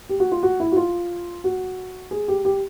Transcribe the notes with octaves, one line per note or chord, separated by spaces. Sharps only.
G4
F#4
F4
F#4
E4
F#4
F4
F#4
G#4
G4
G4